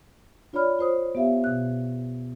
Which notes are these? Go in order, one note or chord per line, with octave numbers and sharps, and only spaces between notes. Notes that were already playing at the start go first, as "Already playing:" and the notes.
D4 F4 C#5 D5 B5 F6
F4 C5 D#6
B3 G4 E5 F5
B2 F#6